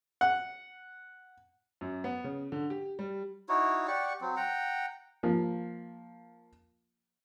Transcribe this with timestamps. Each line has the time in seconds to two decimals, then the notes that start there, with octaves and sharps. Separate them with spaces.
0.21 F#5
1.81 F#2
2.04 B3
2.24 C#3
2.52 D3
2.70 G4
2.99 G3
3.49 D#4 E4 F#4 C#5
3.87 G4 D5 F#5 C#6
4.21 F#3 C4
4.36 F#5 G5 A#5
5.23 F3 A#3